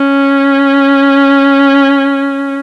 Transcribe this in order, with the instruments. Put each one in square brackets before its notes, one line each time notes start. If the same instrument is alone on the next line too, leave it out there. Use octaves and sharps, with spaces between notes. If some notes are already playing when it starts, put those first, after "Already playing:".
Already playing: [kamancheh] C#4